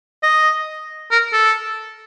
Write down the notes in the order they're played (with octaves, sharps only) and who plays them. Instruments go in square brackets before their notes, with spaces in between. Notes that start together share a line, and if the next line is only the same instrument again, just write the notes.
[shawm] D#5
A#4
A4